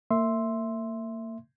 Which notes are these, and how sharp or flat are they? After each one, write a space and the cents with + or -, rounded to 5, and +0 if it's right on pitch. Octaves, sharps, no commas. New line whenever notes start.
A#3 -35 E5 +0 C6 +0